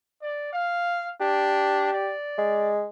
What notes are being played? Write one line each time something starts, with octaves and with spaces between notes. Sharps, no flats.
D5
F5
D4 G4
D5
G#3